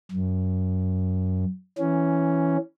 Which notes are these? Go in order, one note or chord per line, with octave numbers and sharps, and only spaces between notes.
F#2
E3 C#4